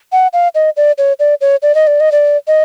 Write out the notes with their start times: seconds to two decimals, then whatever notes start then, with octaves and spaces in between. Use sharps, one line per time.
0.12 F#5
0.33 F5
0.55 D#5
0.77 D5
0.98 C#5
1.19 D5
1.41 C#5
1.62 D5
1.75 D#5
1.87 D5
2.00 D#5
2.12 D5
2.48 D#5